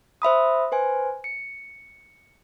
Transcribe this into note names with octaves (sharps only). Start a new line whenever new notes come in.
C5 E5 B5 D#6
B4 C5 G#5
C#7